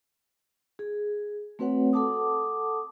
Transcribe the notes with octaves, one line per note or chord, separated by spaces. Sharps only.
G#4
A3 C4 F#4 B4 C#5 F#5
A4 F#5 A5 D6 D#6